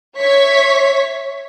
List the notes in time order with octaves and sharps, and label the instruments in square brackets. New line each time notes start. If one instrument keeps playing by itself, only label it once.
[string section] C#5 E5 C#6 G#6 B6